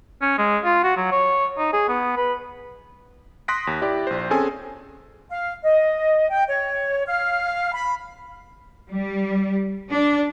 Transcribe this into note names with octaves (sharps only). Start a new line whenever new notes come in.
C#4
G#3
F4
F#4
F#3
C#5
D#4
G#4
B3
B4
C6 D#6 F#6 A#6 B6 D7
D#2
E4 G4 D5
A#1 C5
C4 C#4 G#4 A4 G#5
F5
D#5
G5
C#5
F5
B5
G3
D4